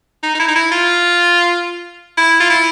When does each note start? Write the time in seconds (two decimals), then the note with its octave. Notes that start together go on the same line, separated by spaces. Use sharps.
0.23 D#4
0.35 D#4
0.40 E4
0.48 D#4
0.56 E4
0.71 F4
2.18 E4
2.40 F4
2.50 E4